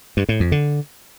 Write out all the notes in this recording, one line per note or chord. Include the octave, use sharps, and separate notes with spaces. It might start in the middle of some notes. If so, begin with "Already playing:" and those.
G2
A2
F2
D3